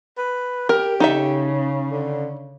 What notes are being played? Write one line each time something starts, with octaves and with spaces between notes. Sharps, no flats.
B4
G4 A#4
C#3 D#4 A4 E5
D3